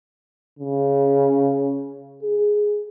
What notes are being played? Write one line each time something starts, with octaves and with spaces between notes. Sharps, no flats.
C#3
G#4